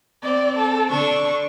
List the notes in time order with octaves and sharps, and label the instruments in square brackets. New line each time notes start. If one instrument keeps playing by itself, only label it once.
[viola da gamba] C4 [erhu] D5
[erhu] A4
[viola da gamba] D3 D4 [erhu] C#6